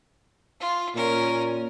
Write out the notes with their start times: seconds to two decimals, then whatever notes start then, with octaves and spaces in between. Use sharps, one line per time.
0.60 F4
0.95 A#2 C#4 A#4